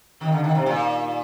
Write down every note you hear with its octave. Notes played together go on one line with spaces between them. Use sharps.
D#3 D#4 G4 D5 F5
D3
D#3
C3
A#2 D#4 G4 D5 F5